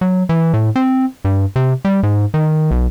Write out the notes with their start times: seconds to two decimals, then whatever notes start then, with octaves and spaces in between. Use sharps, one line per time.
0.01 F#3
0.29 E3
0.54 A2
0.76 C4
1.25 G2
1.56 C3
1.85 G3
2.03 G#2
2.34 D#3
2.71 B1